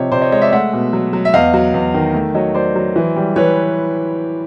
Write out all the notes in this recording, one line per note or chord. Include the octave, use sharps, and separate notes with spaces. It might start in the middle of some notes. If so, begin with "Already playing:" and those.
Already playing: C3 F3 C#5 D#5
C3 C5 D5
C#5 D#5
G#3 C#5 D#5
D5 E5
A3 E5 F#5
B2
F#3
F#3
E5
E2 D#5 F5
F#3
E2
D#3
A3
F#3 C#5 D#5
F#3 C5 D5
F#3
E3
G3
E3 B4 C#5